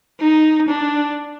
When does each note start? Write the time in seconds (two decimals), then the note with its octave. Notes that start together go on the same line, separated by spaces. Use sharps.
0.20 D#4
0.68 D4